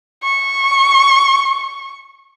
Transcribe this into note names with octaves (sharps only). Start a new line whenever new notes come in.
C#6